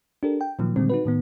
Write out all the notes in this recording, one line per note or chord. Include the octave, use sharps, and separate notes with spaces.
D4 G4 A4 A#4
G5
A#2 D#3 F3 F#3 A#3
A#2 D3 D#3 G3 G#3 C4
D#4 F#4 B4
A2 D#3 B3